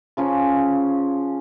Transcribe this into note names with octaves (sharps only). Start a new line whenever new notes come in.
C#3 F3 C#4